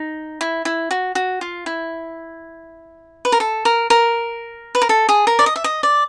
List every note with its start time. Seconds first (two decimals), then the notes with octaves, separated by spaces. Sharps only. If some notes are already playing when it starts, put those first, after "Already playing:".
Already playing: D#4
0.41 E4
0.65 E4
0.91 F#4
1.15 F#4
1.41 F4
1.66 E4
3.25 B4
3.32 A#4
3.40 A4
3.65 A#4
3.90 A#4
4.75 B4
4.82 A#4
4.89 A4
5.09 G#4
5.27 A#4
5.39 D5
5.46 D#5
5.56 E5
5.64 D#5
5.83 D5